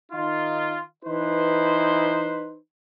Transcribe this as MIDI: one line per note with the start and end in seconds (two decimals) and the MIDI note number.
0.12 0.82 51
0.12 0.82 63
0.12 0.82 65
1.05 2.57 52
1.05 2.57 63
1.05 2.57 71
1.05 2.57 72